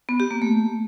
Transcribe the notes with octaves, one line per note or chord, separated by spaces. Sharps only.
B3
G4
A#3
A3